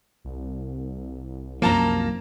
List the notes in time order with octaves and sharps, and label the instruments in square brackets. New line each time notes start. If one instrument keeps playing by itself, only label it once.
[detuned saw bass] C2
[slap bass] F#2 F3 [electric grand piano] A#3 A5 A#5